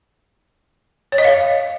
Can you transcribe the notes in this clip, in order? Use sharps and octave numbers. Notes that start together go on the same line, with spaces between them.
C#5
D#5
F5